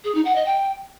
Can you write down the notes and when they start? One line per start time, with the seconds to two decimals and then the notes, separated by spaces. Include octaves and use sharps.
0.04 G#4
0.15 D#4
0.25 F#5
0.35 D#5
0.46 G5